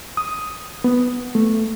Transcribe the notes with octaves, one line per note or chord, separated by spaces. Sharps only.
D#6
B3
A3